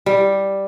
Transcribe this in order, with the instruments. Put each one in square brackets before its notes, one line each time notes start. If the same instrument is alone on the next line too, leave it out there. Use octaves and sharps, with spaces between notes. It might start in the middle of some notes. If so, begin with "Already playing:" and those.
[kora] G3